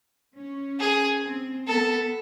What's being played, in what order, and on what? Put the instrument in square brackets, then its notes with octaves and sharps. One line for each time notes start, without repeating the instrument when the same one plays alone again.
[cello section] C#4
[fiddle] G#4
[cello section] C4
[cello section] B3 [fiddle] A4